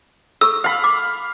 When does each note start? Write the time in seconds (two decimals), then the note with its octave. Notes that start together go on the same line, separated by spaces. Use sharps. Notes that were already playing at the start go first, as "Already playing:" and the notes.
0.41 A4 C#6 E6
0.64 F5 B5
0.84 D6